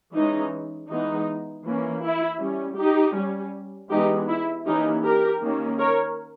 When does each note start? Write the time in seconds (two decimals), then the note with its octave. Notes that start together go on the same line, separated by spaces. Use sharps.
0.13 E3 G#3 C#4 D#4
0.88 E3 G#3 B3 D#4
1.64 E3 A#3 C#4
2.02 E4
2.39 G3 C#4
2.77 D#4 G4
3.15 G3 C#4
3.90 E3 G#3 B3 D#4 G4
4.28 E4
4.66 E3 A#3 C#4 D#4 G4
5.03 G4 A#4
5.41 D#3 A#3 C#4
5.79 A#4 C#5